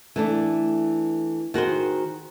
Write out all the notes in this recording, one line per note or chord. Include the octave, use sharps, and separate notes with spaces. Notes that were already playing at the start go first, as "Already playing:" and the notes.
E3 A3 D4
D#3 F#4 G#4 C5